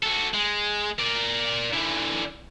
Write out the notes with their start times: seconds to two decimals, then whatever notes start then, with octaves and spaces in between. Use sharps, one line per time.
0.03 F#4 A4
0.34 G#3
0.99 A#4 D5
1.73 D3 E3